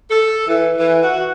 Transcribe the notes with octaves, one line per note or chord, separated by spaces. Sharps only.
A4
E3
E3
F#4